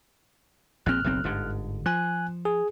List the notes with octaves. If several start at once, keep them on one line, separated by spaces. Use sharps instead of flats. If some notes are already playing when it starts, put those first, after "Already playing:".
A#1 A#2 C4 F6 F#6
F#1 B1 C4
G1 G#2 D3
F3 G#5 F#6
G#4